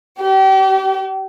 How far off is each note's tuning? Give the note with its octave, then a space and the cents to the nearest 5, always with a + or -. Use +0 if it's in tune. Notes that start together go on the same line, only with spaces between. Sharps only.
G4 -35